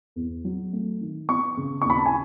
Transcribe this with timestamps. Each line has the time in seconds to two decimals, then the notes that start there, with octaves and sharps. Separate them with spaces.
0.16 E2
0.45 F#3
0.73 A3
1.01 D#3
1.29 B3 C#6
1.57 C#3
1.82 C#6
1.85 D#2 B5
1.97 A5
2.06 G#5